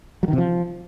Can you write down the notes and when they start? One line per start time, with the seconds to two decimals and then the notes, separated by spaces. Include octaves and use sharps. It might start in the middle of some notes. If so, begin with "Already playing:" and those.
0.23 F#3
0.28 D#3
0.33 C3
0.38 F3